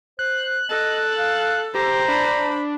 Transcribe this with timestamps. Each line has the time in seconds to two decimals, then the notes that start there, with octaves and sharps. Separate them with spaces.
0.19 C5 F#6
0.70 A4 D#5
1.18 F5
1.75 G4 C5 A#5
2.08 D4 B5